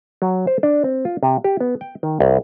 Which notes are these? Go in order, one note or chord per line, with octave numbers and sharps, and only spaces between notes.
F#3
C5
D4
C4
F4
C3
G4
B3
G5
D#3
C2